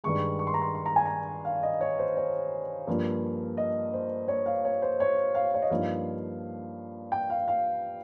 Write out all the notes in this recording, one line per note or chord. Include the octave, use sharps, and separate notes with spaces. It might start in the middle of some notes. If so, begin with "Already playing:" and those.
G2 D#3 G#3 C#6
C#6
C6
A#5
C6
C6
A#5
G#5
A#5
F5
D#5
C#5
C5
C#5
G2 F3 A#3
D#5
C5
C#5
F5
C#5
C5
C#5
F5
C#5
D#5
G2 F3 A#3 D#4 F5
G5
F5
F5